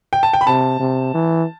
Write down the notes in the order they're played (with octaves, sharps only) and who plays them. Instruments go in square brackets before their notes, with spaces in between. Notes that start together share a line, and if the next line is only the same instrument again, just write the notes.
[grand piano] G5
A5
G5
B5
[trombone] C3 [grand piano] A5
[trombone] C3
E3